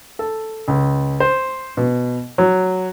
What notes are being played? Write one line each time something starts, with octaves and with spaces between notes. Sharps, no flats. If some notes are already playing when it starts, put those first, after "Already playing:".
A4
C#2
C5
B2
F#3